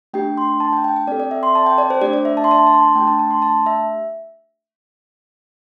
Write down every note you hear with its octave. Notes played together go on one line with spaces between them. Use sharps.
A3 D4 G4 G5
C6
A5
G5
G5
G5
C4 A4 D5
D5
E5
C6
A5
G5
D5
C5
A3 D4 G4 D5
D5
E5
A5
C6
A5
C6
A5
C6
A5
A3 D4 G4 G5
A5
A5
C6
A5
E5